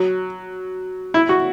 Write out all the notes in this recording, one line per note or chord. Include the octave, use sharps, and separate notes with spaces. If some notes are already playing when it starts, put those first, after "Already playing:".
Already playing: F#3
E4
F#4